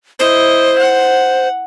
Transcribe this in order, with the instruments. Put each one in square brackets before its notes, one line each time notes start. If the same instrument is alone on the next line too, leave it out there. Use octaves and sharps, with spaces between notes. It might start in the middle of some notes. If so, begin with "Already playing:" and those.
[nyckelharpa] E4 D#5 [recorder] C5
[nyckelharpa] F#5